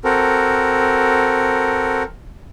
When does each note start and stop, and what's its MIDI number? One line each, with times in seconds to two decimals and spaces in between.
0.04 2.03 60
0.04 2.03 66
0.04 2.03 69
0.04 2.03 70